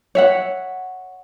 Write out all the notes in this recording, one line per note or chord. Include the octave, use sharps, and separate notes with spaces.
C#5 E5 F#5